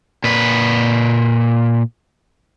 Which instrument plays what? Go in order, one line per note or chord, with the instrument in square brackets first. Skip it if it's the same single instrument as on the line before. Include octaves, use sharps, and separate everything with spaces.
[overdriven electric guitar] A#2 B4